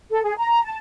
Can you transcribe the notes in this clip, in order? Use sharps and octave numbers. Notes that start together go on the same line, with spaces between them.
A4
G#4
A#5
A5